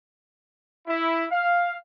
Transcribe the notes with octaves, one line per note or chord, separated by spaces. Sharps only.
E4
F5